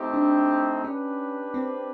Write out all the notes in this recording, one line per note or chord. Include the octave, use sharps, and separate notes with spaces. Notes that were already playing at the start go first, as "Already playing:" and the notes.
Already playing: A3 C4 D#4 G4
D4
C#4 D4 G4 B4
C4